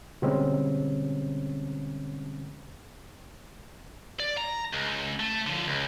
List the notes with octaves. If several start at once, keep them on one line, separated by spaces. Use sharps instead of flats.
B2 D3 G3 G#3 C4 C#4
D5
A#5
C#2
A3
D3 F3
C#2